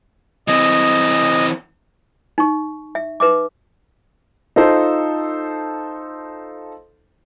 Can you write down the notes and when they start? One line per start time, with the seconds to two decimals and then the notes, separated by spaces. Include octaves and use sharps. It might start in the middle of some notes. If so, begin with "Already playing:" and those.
0.48 E3 C4 D#5
2.38 D#4 C#6
2.95 E5
3.20 D#4 B4 E5 D6
4.56 D#4 F4 A4 C5